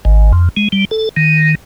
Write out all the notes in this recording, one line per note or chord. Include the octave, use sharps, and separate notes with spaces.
G#1
F2
G#3
G3
A4
D#3